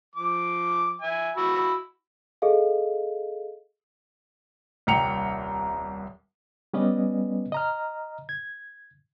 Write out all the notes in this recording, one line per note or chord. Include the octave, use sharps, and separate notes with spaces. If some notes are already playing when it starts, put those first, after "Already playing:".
F3 D6
E5 G#5
F#4 B5 E6
G#4 A4 D#5 F5
D#1 C2 G5 A#5 C#7 F7
G3 B3 C#4 B4 D5 D#5
D#5 A#5 F6
G#6